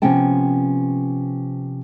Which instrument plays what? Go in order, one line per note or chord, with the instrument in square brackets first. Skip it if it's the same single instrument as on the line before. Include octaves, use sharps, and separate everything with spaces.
[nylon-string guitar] C3 F3 B3 C#4 G5 A5